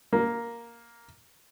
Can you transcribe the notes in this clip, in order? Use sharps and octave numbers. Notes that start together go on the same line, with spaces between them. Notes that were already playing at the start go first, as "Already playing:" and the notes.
A#3